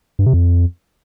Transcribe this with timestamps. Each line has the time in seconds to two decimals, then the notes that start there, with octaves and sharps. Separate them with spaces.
0.19 G2
0.26 C3
0.33 F2